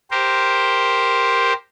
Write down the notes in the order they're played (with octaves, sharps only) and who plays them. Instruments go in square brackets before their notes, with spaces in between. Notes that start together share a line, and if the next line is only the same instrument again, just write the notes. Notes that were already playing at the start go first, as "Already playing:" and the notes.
[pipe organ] G4 A#4 C5